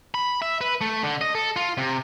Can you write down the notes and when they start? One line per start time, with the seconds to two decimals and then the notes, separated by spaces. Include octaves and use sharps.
0.14 B5
0.42 E5
0.61 B4
0.81 A3
1.04 D3
1.21 D#5
1.35 A4
1.56 F4
1.77 C3